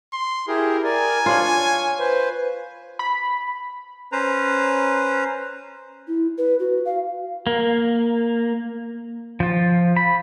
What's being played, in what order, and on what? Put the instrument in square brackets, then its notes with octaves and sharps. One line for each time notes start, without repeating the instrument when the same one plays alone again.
[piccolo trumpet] C6
[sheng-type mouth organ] E4 G4 G#4 [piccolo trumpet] A#4
[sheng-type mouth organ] A#4 D5 [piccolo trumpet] G#5
[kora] D4 F4 [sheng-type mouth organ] C#5
[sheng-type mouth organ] B4 C5
[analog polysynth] B5
[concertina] C#4 B4 C5 A#5
[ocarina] E4
B4
F#4
F5
[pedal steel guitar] A#3
F3 F4
B5